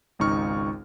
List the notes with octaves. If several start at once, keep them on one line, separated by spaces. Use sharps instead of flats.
G#1 C#2 D#4 C#6 F6